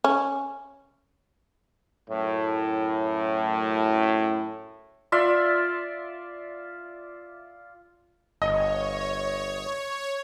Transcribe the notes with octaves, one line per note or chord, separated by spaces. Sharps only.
C#4
F#2 A2
F4 D5 E5 C6
G1 C#5 D#5